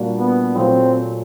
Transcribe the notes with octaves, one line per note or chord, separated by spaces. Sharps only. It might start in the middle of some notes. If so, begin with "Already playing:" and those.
Already playing: A#2 G3 A#3 D4 F#4
B3
A#2 F#3 A3 C4